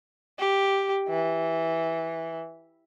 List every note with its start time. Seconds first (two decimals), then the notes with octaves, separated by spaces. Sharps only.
0.39 G4
1.09 E3